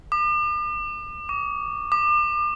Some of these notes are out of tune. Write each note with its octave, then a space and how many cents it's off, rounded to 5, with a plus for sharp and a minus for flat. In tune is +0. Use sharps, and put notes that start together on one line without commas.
D6 +45
D6 -45
D6 +40